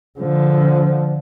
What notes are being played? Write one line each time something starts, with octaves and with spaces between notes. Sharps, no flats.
D3 F3